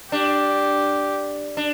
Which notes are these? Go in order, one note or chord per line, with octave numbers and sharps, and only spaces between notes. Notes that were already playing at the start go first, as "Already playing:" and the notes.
D4 G4
D4